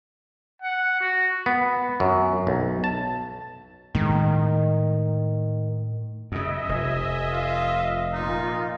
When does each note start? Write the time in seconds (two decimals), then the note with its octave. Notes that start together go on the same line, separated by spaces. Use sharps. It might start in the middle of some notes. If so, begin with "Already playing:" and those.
0.62 F#5
1.00 F#4
1.46 B3
2.00 F#2
2.47 B1
2.84 A5
3.95 A2 D#3 G#3
6.32 F#2 C#3 D#5 E5
6.69 F1 G#5
7.31 F4
8.13 A#2 D#4 F4